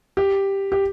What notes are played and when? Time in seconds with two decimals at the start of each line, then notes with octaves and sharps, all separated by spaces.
0.17 G4
0.72 G4